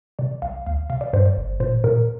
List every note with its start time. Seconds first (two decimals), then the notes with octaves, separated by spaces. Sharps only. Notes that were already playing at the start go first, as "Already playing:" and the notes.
0.19 C3 D5
0.42 C2 F5
0.66 D2 F5
0.90 C3 F5
1.01 D5
1.13 G2 C5
1.25 D5
1.37 G1
1.60 A#2 C5
1.84 A#2 A#4